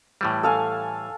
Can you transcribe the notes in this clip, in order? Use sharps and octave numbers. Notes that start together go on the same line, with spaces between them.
A2 E3 G3
A4 F5 G#5